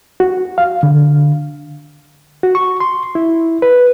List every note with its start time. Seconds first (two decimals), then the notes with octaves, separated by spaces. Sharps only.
0.20 F#4
0.58 F5
0.83 D3
2.43 F#4
2.55 C#6
2.80 C6
3.15 E4
3.62 B4